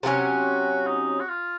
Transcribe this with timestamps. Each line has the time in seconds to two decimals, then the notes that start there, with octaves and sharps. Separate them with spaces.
0.03 C3 F#3 A#3 C#4 F#4
0.87 D#4
1.20 F#4
1.28 F4